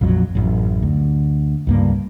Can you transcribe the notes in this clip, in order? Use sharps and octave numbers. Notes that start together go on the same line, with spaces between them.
A#1 F2 F#3
A1 F#2
D2
C#2 G2 A#3